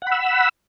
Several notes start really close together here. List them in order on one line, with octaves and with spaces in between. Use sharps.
F#5 B5 E6